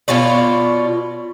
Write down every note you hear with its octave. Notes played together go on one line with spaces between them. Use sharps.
B2 F4 C#5 D5